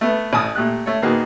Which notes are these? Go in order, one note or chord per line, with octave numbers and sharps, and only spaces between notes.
A3 B3
A1 G#5 A5 D#6
A#2 A3 G4 F#6
A3 C#5
A#2 D#3 A#3 B3 F#4 G#4